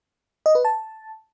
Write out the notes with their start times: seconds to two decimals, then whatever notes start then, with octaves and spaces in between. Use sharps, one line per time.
0.46 D#5
0.55 B4
0.65 A5